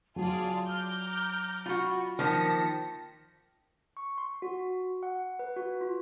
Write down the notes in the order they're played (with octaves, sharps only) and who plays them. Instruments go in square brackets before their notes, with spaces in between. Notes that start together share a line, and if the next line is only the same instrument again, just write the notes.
[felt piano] F#3 [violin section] F4 G#4 D5 [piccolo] A5
[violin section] A#5 D6 G6 [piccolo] F6
[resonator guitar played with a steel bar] F4 F#4 [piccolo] B5
[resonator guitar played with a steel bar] D#3 F3 A#3 [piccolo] A5 [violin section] A#6 B6 C#7
[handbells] C#6
C6
F#4
F#5
B4
F#4
F4